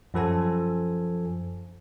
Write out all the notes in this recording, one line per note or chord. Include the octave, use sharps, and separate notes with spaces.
F#2 F3 A4 G#5